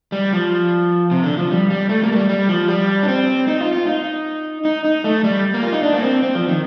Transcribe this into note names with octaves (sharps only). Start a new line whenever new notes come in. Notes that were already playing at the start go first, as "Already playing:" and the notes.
G3
F3
C3
D3
F3
G3
G3
A3
A#3
A3
G3
G3
F3
G3
D4
C4
D#4
F4
F4
D#4
D#4
D#4
A3
G3
A#3
F4
D#4
D4
A#3
C4
C4
F3
D#3